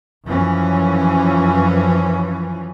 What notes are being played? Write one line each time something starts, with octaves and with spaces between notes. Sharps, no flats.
F#2 E3 F3 C#4